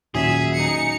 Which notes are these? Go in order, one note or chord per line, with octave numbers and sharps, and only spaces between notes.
D#2 A#2 F#3 C#4 G#4 E5
D#4 C#7